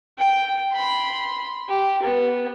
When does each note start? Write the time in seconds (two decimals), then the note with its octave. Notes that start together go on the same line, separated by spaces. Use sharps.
0.18 G5
0.72 B5 C6
1.69 G4
2.03 B3